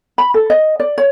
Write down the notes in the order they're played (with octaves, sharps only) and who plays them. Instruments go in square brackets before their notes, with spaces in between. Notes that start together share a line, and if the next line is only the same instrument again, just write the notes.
[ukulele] B5
A4
D#5
D5
C#5